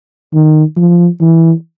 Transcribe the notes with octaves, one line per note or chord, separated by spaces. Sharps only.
D#3
F3
E3